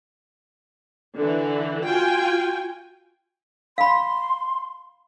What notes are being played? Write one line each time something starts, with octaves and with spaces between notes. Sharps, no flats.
D3 E3
F4 F#4 G5 G#5
F5 B5 C6